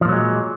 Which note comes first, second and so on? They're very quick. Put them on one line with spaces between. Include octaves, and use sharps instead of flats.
F3 A#2 F#3 G#3